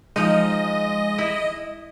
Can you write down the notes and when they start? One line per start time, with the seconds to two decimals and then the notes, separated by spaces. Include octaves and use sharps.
0.16 F3 G#3 D#4 D#5
1.18 E4